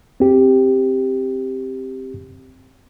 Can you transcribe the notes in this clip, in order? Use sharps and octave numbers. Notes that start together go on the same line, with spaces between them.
C4 G4